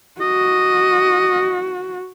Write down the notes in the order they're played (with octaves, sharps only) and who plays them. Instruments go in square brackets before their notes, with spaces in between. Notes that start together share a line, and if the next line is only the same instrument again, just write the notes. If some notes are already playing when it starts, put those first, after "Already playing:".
[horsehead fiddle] F#4 [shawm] D#5